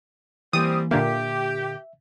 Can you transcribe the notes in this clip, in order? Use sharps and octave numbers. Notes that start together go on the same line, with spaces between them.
E3 G3 A#3 C4 D#6
A#2 D3 A#3 G4 E5